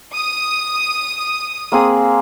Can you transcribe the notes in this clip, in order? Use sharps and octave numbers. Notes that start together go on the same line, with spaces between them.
D#6
A#3 C4 G#4